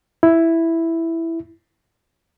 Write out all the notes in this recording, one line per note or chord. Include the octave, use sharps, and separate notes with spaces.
E4